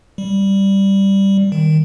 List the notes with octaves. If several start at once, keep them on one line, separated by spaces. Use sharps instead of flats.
G3
D#3